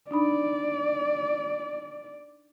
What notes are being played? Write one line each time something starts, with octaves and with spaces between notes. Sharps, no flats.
D4 D#4 D5 B5